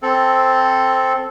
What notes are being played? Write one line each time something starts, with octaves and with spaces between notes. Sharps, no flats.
C4 A4